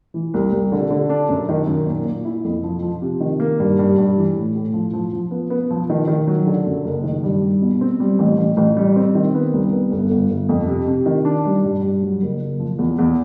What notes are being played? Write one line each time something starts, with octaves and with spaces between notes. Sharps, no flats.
E3
C2
C2
D3
D3
D4
F#2
D#3
F#2
A#2
A#2
E4
F2
F3
F3
C3
D#3
A#3
G2
G2
G2
E3
A2
A2
F3
F3
F3
B3
B3
F3
D#3
D#3
F#3
D3
F#2
F#1
D#3
G2
G3
B2
C4
G3
A1
A1
A1
G3
C4
D#3
B3
C2
B3
G1
G1
G1
F2
C3
C3
D#3
D4
G3
G2
G2
F#3
F#1
F#1
F3
E2
E2